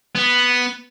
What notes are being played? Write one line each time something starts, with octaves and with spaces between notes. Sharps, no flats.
B3